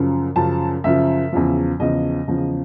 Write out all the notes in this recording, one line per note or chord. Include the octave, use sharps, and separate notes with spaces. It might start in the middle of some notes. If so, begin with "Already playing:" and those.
Already playing: F#2 C#3 F3
F#2 C#3 F3 A5
F#2 C#3 F3 E5
E2 C#3 F3
E2 C#3 F3 D#5
E2 C#3 F3